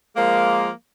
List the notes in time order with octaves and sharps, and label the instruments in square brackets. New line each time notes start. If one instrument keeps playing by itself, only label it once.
[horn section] F3 G#3 A#3